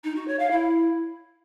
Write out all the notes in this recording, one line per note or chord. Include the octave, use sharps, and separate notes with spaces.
D#4
F#4
C#5
F5
E4